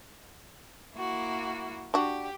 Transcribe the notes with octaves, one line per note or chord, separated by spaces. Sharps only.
A#3 E4 F#4
D4 F#4 G4